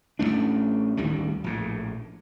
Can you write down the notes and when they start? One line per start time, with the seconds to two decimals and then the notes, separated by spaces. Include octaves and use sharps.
0.19 A1 E3 A3 D4
0.97 A1 D2 D#3 G3
1.44 A#1 A2